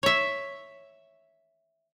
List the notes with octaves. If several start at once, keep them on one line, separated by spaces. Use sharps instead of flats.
C#5 E5